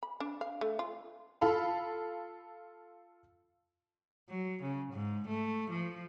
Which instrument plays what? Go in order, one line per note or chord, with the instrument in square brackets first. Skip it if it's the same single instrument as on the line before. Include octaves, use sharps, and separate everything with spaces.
[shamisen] B5
D4
F5
A3
F4
[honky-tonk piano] F4 A4 F5 B5
[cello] F#3
C#3
G#2
A3
F3